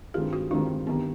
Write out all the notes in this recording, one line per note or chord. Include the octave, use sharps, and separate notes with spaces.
G2 D#3 G#3 C4 F4 G4
F#4
G2 D#3 G#3 C4 D4 F4
G2 D#3 B3